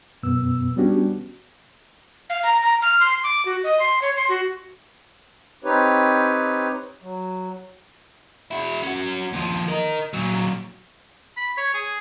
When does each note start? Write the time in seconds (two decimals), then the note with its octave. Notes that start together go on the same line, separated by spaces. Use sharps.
0.23 F#2 B2 B3 E6
0.76 G3 B3 C#4 D4 F#4 G4
2.30 F5
2.43 A#5
2.62 A#5
2.82 F6
3.00 C6
3.24 D6
3.45 F#4
3.64 D#5
3.80 C6
4.02 C#5
4.16 C6
4.29 F#4
5.64 C4 D#4 G4 B4 C#5
7.02 F#3
8.51 E4 F#4
8.83 C#4 F#4
9.33 D#2 F3
9.68 A#4 D#5
10.14 A#2 F#3
11.37 B5
11.57 C#5
11.74 G#4